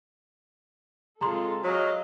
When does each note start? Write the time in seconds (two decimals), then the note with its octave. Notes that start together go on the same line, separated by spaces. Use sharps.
1.21 G#3 C4 F4 A4 A#5 C6
1.64 F#3 G#4 D#5 F5